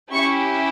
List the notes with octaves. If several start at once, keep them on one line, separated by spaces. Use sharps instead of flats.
C#4 E4 G4 C#6